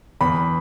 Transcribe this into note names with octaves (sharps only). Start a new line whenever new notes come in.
E2 B5